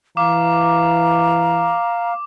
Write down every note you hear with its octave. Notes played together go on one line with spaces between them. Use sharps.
E3 F5 A#5 D6